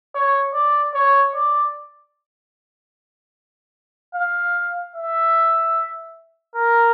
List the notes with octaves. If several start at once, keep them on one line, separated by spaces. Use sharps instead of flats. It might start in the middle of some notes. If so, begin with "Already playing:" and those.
C#5
D5
C#5
D5
F5
E5
A#4